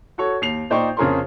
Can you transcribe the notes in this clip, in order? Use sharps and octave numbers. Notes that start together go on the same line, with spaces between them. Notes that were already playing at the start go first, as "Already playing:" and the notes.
F#4 A4 C#5
D#2 C7 F7
A#2 D#4 C5 D5 G5 C#6
F2 C#3 G#4 A#4 C#5 C6